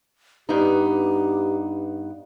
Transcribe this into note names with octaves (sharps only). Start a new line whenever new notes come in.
G2 B3 D#4 G4